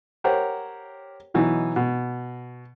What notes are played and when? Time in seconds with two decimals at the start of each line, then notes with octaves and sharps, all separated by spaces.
0.24 G4 A#4 C5 C#5 F#5
1.34 B2 E3 F#3 D#4
1.76 B2